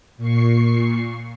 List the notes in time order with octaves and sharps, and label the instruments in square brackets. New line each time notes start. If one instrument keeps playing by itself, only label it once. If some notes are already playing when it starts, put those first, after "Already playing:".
[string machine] A#2 C#6 C7